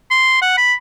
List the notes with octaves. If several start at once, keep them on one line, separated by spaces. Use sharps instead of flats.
C6
F#5
B5